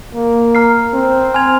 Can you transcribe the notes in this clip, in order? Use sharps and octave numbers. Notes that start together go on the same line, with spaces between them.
A#3
A#5 F6 C7
C4
G#5 C6 F6 G#6 F7